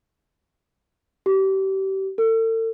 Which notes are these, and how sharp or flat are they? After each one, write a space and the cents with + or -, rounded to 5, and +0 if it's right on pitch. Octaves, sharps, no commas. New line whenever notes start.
G4 -30
A4 +40